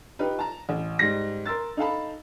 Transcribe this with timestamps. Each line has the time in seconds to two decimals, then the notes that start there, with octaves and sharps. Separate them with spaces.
0.19 D#4 F4 G4 B4
0.39 A5 A#5
0.69 A1
0.99 G#2 G3 A#6
1.46 A#4 C6 E6 A6
1.77 D#4 A4 F5 A5 B5